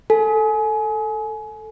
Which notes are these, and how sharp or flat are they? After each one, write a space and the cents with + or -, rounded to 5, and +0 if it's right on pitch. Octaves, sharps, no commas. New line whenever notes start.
A4 +5 G#5 +30